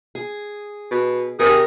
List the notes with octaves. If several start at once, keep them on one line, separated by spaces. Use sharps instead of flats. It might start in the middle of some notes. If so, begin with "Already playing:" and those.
G#4
B2
C3 G#4 A#4